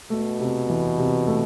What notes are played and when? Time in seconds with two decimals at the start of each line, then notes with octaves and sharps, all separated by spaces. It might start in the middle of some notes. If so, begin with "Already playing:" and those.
0.10 B2 A3
0.40 C3
0.70 E3
0.98 C3
1.27 A3